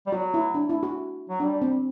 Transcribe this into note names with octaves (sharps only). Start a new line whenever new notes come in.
G3
F#3 F#4
E4
D4
E4
F#4
F#3
G3 D4
C4